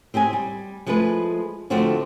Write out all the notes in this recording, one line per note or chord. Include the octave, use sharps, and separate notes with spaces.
C4 G4 D#5 G#5
G3
F3 G#3 A3 G#4 B4
D3 F3 A3 C4 D4 F#4